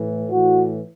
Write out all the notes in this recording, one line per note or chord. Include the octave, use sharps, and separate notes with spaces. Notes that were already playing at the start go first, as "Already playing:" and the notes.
Already playing: A2 E3
A2 E3 F#4